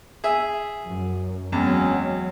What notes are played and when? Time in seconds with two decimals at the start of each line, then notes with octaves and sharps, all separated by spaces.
0.24 G#4 E5
0.85 F#2
1.52 E2 F#3 G#3 C4 C#4